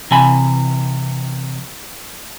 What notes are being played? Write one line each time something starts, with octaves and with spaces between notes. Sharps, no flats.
C3 E3 G#5 B5